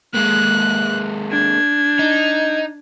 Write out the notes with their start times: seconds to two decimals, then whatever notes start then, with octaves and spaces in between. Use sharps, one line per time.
0.14 G#3 A#3 F#6
1.30 D4 G#6
1.99 D#4